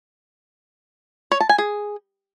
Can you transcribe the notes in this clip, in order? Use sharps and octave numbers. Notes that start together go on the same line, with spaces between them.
C#5
A5
G#5
G#4